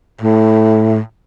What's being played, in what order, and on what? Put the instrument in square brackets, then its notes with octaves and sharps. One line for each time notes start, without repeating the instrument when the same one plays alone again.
[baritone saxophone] A2